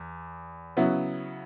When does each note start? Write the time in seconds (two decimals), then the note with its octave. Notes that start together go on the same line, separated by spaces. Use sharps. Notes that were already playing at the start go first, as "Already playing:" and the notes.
Already playing: E2
0.77 C#3 F#3 B3 E4